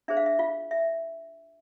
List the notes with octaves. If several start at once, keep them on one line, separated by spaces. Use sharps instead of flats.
D4 G#4 C5 E5
F5
E5
F4 F5
E5